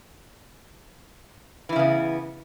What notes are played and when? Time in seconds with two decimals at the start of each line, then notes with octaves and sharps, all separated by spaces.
1.69 E3
1.72 E4
1.76 C#3
1.79 B3